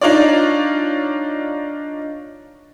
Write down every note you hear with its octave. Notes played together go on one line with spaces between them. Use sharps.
D4 D#4 F4 C#5 D5